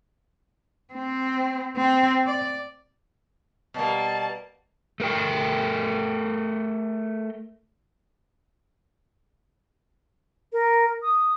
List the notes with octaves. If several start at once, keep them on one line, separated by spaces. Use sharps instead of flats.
C4
C4
D5
B2 G3 A#3 A5
A3 A#4 G5
A#4
D#6